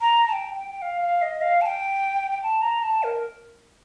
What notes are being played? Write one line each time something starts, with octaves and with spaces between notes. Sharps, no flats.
A#5
A5
G5
G5
G5
F5
F5
D#5
F5
A5
G5
G5
A5
A#5
A5
A#4